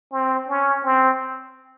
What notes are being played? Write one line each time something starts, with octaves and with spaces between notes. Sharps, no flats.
C4
C#4
C4